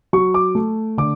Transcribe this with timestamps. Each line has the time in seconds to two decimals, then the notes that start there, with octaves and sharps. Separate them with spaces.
0.13 F#3 C#6
0.34 D6
0.55 A3
0.98 D3 D6